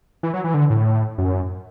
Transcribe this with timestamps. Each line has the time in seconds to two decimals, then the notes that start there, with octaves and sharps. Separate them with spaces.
0.23 E3
0.34 F#3
0.44 E3
0.54 D3
0.70 A2
1.18 F#2